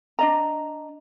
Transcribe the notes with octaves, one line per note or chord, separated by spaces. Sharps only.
D4 D#5 A#5